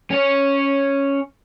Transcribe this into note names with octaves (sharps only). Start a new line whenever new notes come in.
C#4 C#5